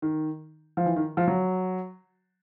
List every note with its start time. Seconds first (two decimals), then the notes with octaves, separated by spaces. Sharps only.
0.02 D#3
0.77 F3
0.86 E3
0.96 D#3
1.17 F3
1.27 F#3